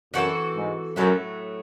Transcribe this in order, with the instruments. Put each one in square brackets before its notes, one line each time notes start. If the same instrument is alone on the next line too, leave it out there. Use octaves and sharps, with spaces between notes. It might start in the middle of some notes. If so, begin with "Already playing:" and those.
[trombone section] F#2 [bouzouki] E3 C4 F#4 A4
[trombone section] G#2
[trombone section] F#2 [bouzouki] A2 F#3 A3